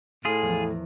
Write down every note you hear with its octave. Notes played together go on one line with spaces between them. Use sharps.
A2 F4 G#4
E2 F3
A#4